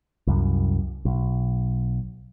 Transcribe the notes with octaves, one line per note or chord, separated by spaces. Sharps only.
C2 F#2
B1